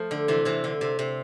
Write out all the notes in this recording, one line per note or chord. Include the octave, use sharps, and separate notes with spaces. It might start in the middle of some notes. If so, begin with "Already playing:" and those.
Already playing: F3 A3
D3
C3 E3
C3 E3
D3
C3
C3